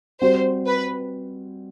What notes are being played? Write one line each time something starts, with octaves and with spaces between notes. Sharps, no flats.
G3 C4 F#4 C5
B4